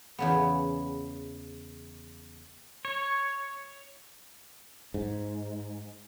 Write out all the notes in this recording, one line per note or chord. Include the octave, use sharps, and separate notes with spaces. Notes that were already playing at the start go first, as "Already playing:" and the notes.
E2 C#3 B3
C#5
G#2